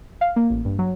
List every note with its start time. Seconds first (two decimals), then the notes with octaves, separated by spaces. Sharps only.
0.21 F5
0.36 A#3
0.50 A1
0.65 G2
0.79 F#3